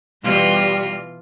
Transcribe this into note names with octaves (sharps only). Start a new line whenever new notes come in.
B2 E3 G3 F4